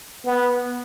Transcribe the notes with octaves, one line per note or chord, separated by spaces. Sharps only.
B3